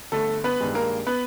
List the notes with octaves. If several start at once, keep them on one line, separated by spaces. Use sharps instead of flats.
G1 A3 A4
B3 B4
G2 D#3 G#3
A#3 A#4
B3 B4